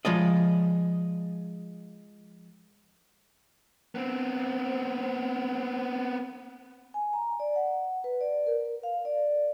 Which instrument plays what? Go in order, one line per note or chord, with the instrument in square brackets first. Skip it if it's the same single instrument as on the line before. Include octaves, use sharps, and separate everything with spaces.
[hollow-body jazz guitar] F3 G#3 D5 D#5
[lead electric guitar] B3 C4
[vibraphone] G#5
A#5
D5
F#5
B4
D5
A#4
F5
D5